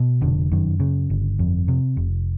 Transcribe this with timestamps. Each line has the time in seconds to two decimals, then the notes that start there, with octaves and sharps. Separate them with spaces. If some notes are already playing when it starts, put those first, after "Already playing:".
Already playing: B2
0.21 F1 D3
0.51 F#2 D#3
0.80 C#3
1.10 G1
1.39 F2
1.68 C3
1.97 F1